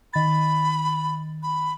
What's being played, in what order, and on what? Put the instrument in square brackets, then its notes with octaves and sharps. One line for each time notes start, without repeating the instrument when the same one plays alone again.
[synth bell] D#3 A6 [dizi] B5
[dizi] B5